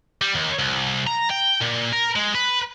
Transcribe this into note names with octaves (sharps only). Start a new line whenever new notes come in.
G3
D#2
C2
A#5
G5
A#2
A#4
G#3
B4